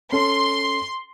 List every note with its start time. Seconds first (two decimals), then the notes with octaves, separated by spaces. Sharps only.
0.12 C#4 A4 C6